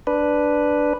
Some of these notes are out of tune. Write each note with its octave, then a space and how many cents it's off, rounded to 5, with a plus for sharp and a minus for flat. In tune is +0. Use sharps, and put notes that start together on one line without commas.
D4 +0 B4 +0